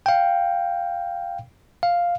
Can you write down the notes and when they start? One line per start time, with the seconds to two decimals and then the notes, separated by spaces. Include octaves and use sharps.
0.06 F5 G5
1.83 F5